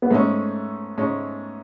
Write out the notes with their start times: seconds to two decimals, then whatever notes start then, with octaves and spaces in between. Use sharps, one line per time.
0.02 B3
0.10 G#2 G#3 A3 C#4
0.98 G#2 G#3 C#4